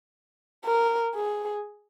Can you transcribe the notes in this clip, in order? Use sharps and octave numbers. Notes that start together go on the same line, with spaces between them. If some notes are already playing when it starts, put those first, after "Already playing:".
A#4
G#4